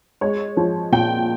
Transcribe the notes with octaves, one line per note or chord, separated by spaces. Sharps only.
G#3 C#5
F3
A#2 G5